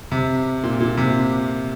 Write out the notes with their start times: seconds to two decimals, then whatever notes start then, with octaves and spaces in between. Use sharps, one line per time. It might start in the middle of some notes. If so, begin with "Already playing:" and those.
0.12 C3
0.63 A#2
0.80 A#2
0.97 C3